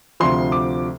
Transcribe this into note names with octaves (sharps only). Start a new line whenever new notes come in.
D2 C3 F3 C6
D6